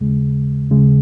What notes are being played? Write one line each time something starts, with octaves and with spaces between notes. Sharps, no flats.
D#2 C#3 G#3
D#2 C#3 G#3